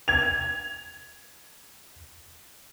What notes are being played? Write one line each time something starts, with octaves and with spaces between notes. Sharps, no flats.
G#6 F7